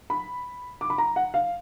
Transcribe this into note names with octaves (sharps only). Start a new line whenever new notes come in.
B5
D6
B5
A#5
F#5
F5